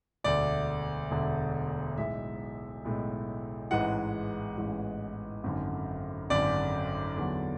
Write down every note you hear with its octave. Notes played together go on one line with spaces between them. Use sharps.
E1 D2 D3 D5
E1 D2 D3
B1 A2 G#3 E5
B1 A2 G#3
A1 G#2 E3 G#3 F#5
A1 G#2 E3 G#3
G#1 F#2 D3
G#1 F#2 D3 D5
E2 D3 F#3